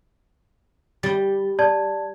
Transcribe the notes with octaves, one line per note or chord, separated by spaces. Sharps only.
G3 A6 G7
D5 A5 G#6